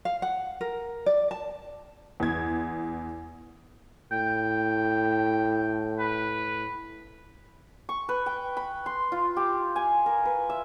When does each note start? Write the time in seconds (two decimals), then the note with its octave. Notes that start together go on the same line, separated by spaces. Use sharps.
0.05 F5
0.22 F#5
0.61 A#4
1.06 D5
1.31 A5
2.20 E2 G#6
4.12 A2 G5
5.99 B4
7.89 C#6
8.09 B4
8.26 G5
8.57 B5
8.86 C6
9.12 F4
9.36 G4
9.76 G#5
10.06 A#4
10.25 B4
10.50 E5